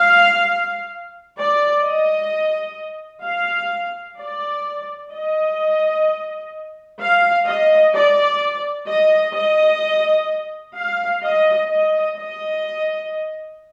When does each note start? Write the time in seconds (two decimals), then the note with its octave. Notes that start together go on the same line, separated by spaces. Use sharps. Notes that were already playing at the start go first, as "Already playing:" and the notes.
Already playing: F5
1.37 D5
1.83 D#5
3.24 F5
4.19 D5
5.12 D#5
7.00 F5
7.46 D#5
7.94 D5
8.88 D#5
9.35 D#5
10.76 F5
11.22 D#5
11.70 D#5
12.16 D#5